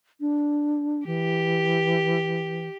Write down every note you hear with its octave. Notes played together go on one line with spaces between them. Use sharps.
D4
E3 G4